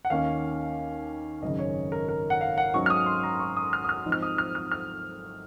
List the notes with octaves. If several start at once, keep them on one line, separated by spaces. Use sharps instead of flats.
F#5
D#2 D#3 A#3 C#4 F5
G#1 F#2 C#3 D#5
C#5
A#4
A#4
F#5
F5
F#5
G#2 F#3 C#4 C#6
F6
D#6
C6
A#5
C#6
D#6
F6
D#6
F6
G#2 F3 C4 D#4
F6
D#6
F6
F6
F6